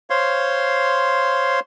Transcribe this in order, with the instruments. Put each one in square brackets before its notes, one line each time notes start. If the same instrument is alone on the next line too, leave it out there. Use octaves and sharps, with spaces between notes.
[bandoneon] C5 C#5 F5 C6